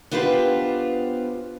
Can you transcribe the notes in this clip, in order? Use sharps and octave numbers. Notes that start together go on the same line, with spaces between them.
B3 D4 F4 G4 B4 C5